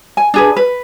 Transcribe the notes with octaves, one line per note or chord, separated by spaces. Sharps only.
G#5
D4 G#4 B4
B4